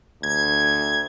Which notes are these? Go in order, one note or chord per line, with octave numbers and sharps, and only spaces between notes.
D2 G#6